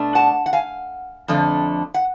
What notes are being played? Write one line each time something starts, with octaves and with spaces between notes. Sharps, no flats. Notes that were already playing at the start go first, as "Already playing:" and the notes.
Already playing: B2 A3 D4
F#5 A5
F#5
F5 G#5
F2 D3 F3 A3 D4
F#5